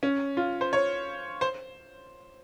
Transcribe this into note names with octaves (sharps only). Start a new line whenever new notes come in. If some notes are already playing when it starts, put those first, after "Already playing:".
C#4
F4
C5
C#5
C5